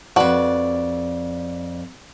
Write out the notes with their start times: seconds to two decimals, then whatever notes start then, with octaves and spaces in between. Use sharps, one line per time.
0.16 F2 F#4 B4 D5